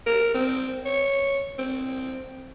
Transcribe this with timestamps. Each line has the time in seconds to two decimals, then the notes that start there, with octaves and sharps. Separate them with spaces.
0.06 A#4
0.35 C4
0.85 C#5
1.59 C4